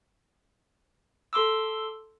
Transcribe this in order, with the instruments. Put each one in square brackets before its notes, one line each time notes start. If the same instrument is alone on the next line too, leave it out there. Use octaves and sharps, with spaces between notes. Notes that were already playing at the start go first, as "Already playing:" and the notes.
[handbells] A4 C6 D6 E6